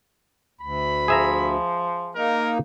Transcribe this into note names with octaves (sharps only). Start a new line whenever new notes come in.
D2 B5
F3 G#4 E5 A#5
A#3 D#4 A#4